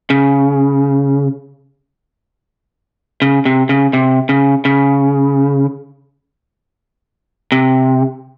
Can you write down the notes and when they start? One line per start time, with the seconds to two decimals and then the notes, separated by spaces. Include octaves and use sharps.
0.10 C#3
3.22 C#3
3.45 C3
3.69 C#3
3.93 C3
4.29 C#3
4.65 C#3
7.52 C3